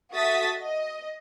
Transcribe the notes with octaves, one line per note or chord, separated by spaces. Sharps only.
F#4 A4 E5 D#6 A6 B6
D#5